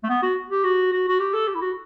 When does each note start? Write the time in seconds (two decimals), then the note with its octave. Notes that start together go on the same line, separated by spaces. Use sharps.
0.03 A3
0.09 B3
0.22 F#4
0.50 G4
0.64 F#4
0.92 F#4
1.08 F#4
1.20 G4
1.34 A4
1.48 G4
1.55 E4
1.61 F#4